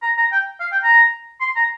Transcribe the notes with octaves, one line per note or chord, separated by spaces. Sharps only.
A#5
A#5
G5
F5
G5
A#5
C6
A#5